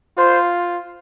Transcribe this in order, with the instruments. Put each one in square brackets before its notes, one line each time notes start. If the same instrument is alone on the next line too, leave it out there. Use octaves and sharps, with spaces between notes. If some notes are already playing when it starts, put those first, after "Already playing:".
[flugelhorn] F4 [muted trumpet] C5